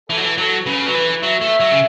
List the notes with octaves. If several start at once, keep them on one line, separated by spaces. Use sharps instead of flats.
E3 A4
F#3
E3
F#3 A4
C#3 B4
F#3
E3
F#3 E5
A3
F#3
C#3